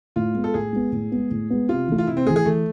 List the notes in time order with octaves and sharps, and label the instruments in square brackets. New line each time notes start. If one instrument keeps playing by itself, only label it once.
[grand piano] A2 [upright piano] F4
[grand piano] G#3 B3
[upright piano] A4
[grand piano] A2 [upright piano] G#4
[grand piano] G#3 B3
A2
G#3 B3
A2
G#3 B3
[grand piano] C3 [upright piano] F4
[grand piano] E3 A3
[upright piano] F4
[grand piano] C3 [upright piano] E4
[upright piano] C4
[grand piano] A3 [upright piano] G#4
[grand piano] E3
[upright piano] G#4
[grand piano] E3 [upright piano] A3